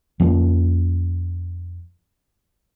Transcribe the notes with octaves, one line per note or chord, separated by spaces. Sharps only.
F2 F3 A#3 C#4